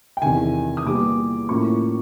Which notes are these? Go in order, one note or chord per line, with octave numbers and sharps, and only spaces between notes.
G5
E2 C3 D#3 G#5
D#6
A#2 G3 B3 D6
A2 F3 A#3 C#4 C#6